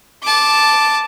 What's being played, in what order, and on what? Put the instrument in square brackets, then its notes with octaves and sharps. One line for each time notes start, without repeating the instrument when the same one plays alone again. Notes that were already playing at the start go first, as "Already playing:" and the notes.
[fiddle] A5 D6